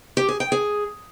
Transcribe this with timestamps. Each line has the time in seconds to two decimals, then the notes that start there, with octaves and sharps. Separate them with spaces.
0.17 G4
0.29 G#4
0.40 G5
0.52 G#4